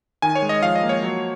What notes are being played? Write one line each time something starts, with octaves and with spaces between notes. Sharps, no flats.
D#3 G#5
C#5
G#3
D#5
F3 F5
D#5
A#3
C#5
F#3